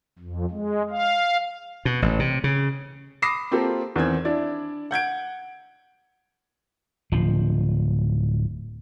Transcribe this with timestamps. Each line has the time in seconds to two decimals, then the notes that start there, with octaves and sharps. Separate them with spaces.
0.19 F2
0.50 G#3
0.91 F5
1.85 B2
2.02 A1
2.19 C3
2.44 C#3
3.22 B5 D6 D#6 A#6 C7 E7
3.51 A#3 C4 F4 G4 A4 A#4
3.96 E2 D#3 C4 G#6
4.25 D4 E4 D5
4.91 F#5 G6 G#6 D7
7.12 D1 F3